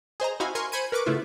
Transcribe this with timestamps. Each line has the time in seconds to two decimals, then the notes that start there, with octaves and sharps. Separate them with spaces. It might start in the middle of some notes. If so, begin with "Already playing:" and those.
0.20 G#4 C5 D#5 A#5
0.40 C4 D#4 E4 F#4 F5 G#5
0.55 A#4 G#5 C6 C#6
0.72 C5 G#5 B5 G#6 C#7 D#7
0.92 A#4 B4 C#6 D6
1.06 C#3 A3 B3 E4 F4